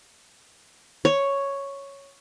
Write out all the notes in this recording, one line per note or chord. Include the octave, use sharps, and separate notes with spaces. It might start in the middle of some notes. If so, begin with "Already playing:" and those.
C#5